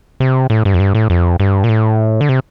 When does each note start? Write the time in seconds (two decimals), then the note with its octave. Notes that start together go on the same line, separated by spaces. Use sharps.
0.20 C3
0.50 A2
0.65 G2
0.74 F2
0.80 G2
0.95 A2
1.10 F2
1.40 G2
1.64 A#2
1.69 A2
2.21 D3
2.29 C3